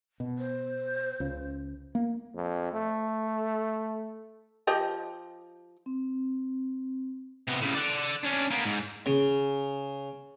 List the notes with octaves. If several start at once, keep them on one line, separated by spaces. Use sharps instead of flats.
B2
C5
C#2 C#3
A#3
F2
A3
F3 G4 D#5
C4
C3 B3
A2 C#3
D5 F#5
C#4 D4
A#3 B3
G#2
C#3